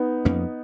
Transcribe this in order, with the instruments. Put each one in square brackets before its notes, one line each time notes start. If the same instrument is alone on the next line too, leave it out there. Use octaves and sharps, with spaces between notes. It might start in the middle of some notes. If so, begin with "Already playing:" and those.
Already playing: [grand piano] B3 D#4
[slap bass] F2 F3 A#3 C#4